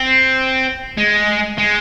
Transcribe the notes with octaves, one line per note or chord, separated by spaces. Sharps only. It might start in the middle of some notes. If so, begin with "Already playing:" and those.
Already playing: C4
G#3
G#3